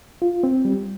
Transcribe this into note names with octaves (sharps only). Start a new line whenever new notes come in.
F4
C4
G3